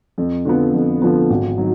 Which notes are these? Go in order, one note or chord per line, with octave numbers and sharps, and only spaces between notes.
F2
D3 F3 B3
F2
D3 F3 B3
G#1
D#3 F#3